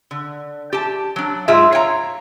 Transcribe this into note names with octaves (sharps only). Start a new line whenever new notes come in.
D3
G4 A5
F#3 D4
G#2 F4 G#4 E5
C#5 F5 G5 A#5